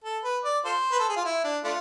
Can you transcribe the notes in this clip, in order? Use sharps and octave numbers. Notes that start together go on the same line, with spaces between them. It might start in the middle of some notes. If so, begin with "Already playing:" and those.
A4
B4
D5
F4 A4 C5
B4
A4
G#4
F4
E4
D4
A3 D4 F4